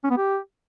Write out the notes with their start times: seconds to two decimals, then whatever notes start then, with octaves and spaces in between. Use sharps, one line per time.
0.04 C#4
0.10 B3
0.17 G4